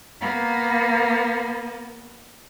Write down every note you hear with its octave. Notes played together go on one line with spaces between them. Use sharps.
A#3 B3